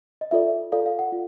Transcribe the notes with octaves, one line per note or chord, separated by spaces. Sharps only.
D#5
F4 A4 D5 E5
F4 A4 D5 F5
F5
F#5
F4